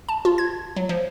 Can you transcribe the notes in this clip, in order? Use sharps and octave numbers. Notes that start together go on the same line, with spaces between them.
A5
F4
G#6
F#3
F3